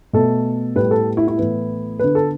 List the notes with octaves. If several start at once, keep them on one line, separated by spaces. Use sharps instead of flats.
B2 A3 A4
A2 G3 B3 B4
A4
E4
E4
A2 E3 B3
D3 B3 B4
A4